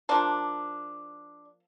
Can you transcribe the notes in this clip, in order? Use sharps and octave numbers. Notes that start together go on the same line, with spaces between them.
F3 A#3 D4